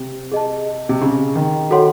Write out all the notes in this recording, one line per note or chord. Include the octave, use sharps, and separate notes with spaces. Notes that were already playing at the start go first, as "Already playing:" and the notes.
Already playing: C3
G#4 D#5 A5
C3
C#3
D#3
F#4 A4 C#5 F#5 C6